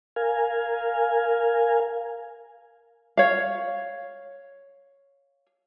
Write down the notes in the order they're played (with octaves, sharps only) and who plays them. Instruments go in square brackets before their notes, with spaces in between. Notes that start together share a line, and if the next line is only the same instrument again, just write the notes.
[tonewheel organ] A#4 F5 G#5
[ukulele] C#5 F5